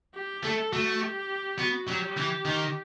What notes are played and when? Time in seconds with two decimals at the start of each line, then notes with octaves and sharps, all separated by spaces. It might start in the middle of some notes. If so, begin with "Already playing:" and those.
0.15 G4
0.44 A3 A4
0.73 A3 F#4
1.02 G4
1.59 B3 F#4
1.88 F#3 G4
2.17 E3
2.45 D#3